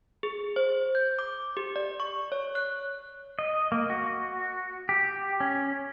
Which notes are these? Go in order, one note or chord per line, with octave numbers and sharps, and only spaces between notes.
G#4
C5
G6
D6
G4
D5
C#6
C#5
F#6
D#5
A#3
F#4
G4
C#4